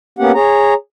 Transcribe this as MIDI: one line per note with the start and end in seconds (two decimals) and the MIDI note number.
0.19 0.32 58
0.19 0.32 59
0.19 0.32 61
0.19 0.32 67
0.19 0.32 78
0.34 0.74 68
0.34 0.74 73
0.34 0.74 82